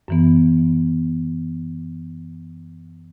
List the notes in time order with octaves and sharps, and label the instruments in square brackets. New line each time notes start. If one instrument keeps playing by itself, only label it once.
[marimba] F#2 E3 B3